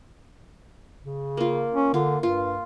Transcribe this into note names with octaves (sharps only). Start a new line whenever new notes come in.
C#3
A#3 F4
C#4
D3 F4
G2 F4